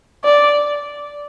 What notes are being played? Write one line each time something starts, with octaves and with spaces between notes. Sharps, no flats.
D5